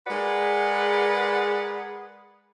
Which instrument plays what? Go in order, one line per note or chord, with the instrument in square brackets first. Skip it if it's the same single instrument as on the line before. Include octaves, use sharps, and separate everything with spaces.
[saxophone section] G#3 G#4 A#4 B4 D5 F#5